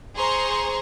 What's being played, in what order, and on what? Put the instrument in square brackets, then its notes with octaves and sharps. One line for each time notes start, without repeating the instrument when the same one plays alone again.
[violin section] G#4 C5 A#5 C6 C#6